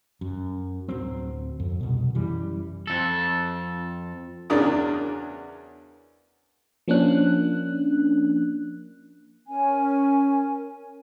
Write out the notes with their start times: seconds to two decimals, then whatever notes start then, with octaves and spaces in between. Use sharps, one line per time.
0.21 F#2
0.88 D1 F#3 C4
1.60 F2
1.81 C2 B2
2.15 F#2 E3 G3
2.87 F2 A4
4.50 E2 C#3 F#3 D4 A#4 D#6
6.88 F3 A#3 C#4 D4 F#6
9.46 C#4 A#4 G#5